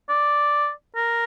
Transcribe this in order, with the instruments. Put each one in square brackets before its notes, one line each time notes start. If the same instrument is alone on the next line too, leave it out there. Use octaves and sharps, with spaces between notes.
[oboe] D5
A#4